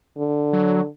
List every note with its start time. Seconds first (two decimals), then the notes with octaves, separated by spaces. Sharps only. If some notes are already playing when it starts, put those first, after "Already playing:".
0.18 D3
0.53 F#3